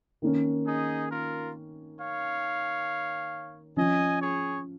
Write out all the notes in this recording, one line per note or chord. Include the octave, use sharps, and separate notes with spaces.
D#3 A#3 C#4
D#4 G#4
F4 A#4
C#5 F5
F3 C#4 D#5 G#5
G#4 C#5